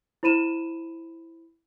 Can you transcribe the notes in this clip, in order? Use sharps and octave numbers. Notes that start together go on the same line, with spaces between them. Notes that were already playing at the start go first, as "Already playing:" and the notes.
E4 C5 B5 D#7 E7